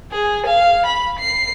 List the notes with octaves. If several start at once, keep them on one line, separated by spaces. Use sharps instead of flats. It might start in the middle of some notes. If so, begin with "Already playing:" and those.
G#4
F5
B5
C7